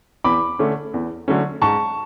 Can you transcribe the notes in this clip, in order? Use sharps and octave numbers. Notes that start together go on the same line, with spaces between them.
E2 B5 D6
D3 A3 C#4
E2
D3 F#3 A3 C#4
G#2 A5 C#6